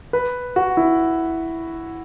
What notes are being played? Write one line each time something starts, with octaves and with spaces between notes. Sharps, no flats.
B4
F#4
E4